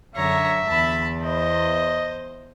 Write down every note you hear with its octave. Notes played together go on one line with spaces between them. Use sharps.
F#2 D3 C#5 E5 A#5
E2 A5 B5
C5 D#5